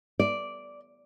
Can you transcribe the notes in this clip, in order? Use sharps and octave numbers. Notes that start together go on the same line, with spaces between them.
D5